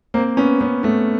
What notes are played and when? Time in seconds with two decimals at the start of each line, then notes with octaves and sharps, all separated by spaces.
0.14 A#3 C4
0.37 B3 C#4
0.61 B3 C#4
0.83 A3 B3